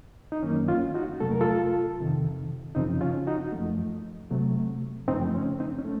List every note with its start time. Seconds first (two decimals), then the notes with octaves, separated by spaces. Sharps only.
0.32 D#4
0.43 F#2 D#3 F#3 A#3 C#4
0.68 C#4 F4
0.95 D#4 F#4
1.20 F2 C3 F#3 A3 A4
1.31 A#4
1.41 F4 A4
1.99 F2 C3 D#3
2.75 F#2 C#3 F3 C4 D#4
3.01 C#4 F4
3.27 D#4 F#4
3.52 F#2 F3 A3
4.30 C3 F#3 A3
5.08 F#2 C#3 F3 A3 C4 D#4
5.34 C#4
5.60 C4 D#4
5.79 C#4
5.85 A3